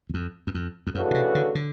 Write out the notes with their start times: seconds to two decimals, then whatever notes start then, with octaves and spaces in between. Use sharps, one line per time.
0.09 E2
0.14 F2
0.47 F#2
0.54 F2
0.87 F2
0.95 F#2 C#3 E3 A3 D4 F#4
1.11 B2
1.14 C3
1.35 D3
1.55 D3